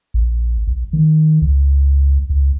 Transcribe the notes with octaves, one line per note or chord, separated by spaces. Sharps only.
A#1
B1
D#3
C#2
C#2